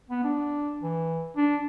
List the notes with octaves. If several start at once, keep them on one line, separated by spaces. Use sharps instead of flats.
B3
D4
E3
D4